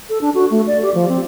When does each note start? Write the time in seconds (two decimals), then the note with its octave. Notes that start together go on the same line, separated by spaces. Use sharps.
0.09 A4
0.21 D4
0.35 F#4
0.50 A3
0.67 D5
0.83 G4
0.94 F3
1.09 C4